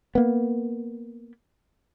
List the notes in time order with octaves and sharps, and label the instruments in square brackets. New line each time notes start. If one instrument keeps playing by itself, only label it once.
[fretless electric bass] A#3 B3